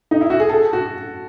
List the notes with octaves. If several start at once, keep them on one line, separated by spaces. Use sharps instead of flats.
D#4
E4
F#4
G#4
A4
F#4